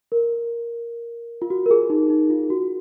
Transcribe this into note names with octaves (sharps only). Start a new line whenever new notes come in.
A#4
F4
F#4
A#4
G#4
D#4
D#4
F4
F#4